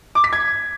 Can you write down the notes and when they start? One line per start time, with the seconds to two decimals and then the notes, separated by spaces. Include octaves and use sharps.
0.15 D6
0.24 B6
0.33 G#6